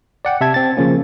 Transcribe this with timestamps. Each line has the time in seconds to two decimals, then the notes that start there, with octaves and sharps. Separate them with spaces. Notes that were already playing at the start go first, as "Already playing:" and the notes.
0.25 D5 F#5 G5
0.41 C3 E5 A5 G#6
0.54 C4 A6
0.77 C#3 F3 A#3 C#4